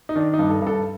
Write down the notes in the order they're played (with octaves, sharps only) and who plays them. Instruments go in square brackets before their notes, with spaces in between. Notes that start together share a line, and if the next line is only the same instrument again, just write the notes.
[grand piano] D#4
D#3 D4
D#4
G2
A4
G2 A4